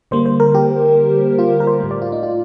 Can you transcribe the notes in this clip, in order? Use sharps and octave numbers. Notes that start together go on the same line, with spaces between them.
D3 G3 A#3 C5
C5
A#4
G4
F4
A#4
C5
A2 A3
D5
F4
D#4
F4